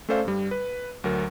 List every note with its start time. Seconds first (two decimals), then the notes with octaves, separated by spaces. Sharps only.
0.09 A3 C#4 A4 C5 D5 F5
0.25 G2 G3
0.51 B4
1.04 D2 F#3 A#4